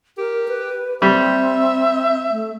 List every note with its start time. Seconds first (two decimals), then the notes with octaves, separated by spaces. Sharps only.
0.18 G4 A#4
0.48 B4
1.02 G3 C4 E5
2.31 A3